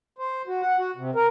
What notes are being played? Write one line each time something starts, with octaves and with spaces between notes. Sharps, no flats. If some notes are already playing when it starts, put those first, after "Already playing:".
C5
F#4
F#5
F#4
C3
A#4